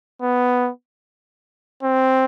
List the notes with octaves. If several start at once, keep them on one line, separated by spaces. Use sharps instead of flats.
B3
C4